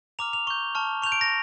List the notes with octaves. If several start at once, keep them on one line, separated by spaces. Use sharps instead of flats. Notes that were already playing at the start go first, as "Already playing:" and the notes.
A#5 D6 F6 F7
F7
C#6 G6 G7
A5 C#6 F6
C#6 G6 F7
D7
A#6